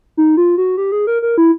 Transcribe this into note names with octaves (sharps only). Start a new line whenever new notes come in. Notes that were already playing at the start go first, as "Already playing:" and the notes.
D#4
F4
F#4
G4
G#4
A#4
A#4
E4